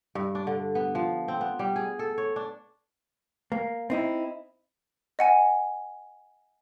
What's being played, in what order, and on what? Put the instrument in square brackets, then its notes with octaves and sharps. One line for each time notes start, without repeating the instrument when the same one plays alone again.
[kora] G2
D4
D3
B3
F3
C4
B3
G3
G#4
A4
C#5
D4
[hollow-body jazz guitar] A#3
C4 D#4 E4
[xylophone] D#5 F#5 G#5